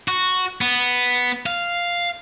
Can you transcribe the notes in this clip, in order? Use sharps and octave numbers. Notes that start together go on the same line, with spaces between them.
F#4
B3
F5